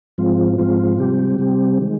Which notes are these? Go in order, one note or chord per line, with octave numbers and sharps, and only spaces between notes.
G#2 F3 G#3 C4 F4
G#2 F3 G#3 C4 F4
C3 G3 C4 G4
C3 G3 C4 G4
D#3 G#3